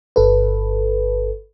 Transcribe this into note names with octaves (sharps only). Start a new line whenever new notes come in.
G1 A4 B4